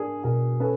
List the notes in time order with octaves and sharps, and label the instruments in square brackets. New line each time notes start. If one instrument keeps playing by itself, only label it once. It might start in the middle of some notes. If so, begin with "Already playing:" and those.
Already playing: [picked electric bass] D4 [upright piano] G#4 A#4
[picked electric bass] B2 [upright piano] G#4 A#4
[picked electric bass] C#4 [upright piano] A4 B4